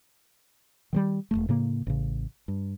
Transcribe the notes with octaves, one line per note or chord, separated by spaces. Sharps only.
D#3 F3 G3
E1 D#2 A3
A2 C#3 A#3
A1 C#3
G2